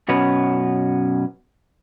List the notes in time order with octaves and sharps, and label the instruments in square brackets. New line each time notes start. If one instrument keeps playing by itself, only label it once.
[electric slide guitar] F#2 B2 C#4 F#4 B4